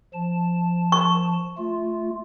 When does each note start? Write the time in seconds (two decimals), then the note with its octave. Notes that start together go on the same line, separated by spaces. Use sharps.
0.14 F3 A5
0.92 C#6
1.58 A3 F4